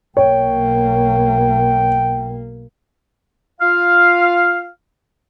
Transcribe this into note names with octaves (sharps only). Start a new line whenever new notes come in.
B1 A#3 C#5 G5
F4 F5